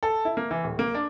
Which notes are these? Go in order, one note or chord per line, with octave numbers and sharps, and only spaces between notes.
A4
E4
A#3
E3
D1
A#3
D4